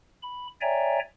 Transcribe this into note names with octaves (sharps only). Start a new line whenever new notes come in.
B5
C#5 D5 E5 G5 G#5 A#5